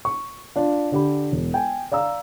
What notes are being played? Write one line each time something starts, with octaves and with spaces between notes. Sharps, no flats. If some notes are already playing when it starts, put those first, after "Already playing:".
C#6
D4 F4
D3 G4 B5
E1
G5 G#5
D5 F5 A#5 E6